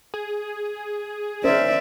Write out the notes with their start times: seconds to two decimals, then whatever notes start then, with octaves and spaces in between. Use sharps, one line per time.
0.14 G#4
1.44 C#4 A#4 C5 D5 E5